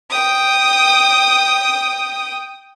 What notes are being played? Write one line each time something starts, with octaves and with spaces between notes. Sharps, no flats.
G5 D#6